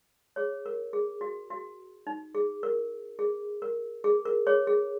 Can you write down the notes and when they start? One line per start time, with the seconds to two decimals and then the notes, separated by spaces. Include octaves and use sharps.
0.36 G#4 C#5
0.66 A#4
0.93 G#4
1.21 F#4
1.50 F#4
2.07 D#4
2.35 G#4
2.63 A#4
3.19 G#4
3.62 A#4
4.04 G#4
4.25 A#4
4.47 G#4 C#5
4.67 G#4